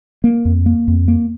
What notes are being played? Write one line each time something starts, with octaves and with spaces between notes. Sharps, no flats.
A#3
F2
A#3
F2
A#3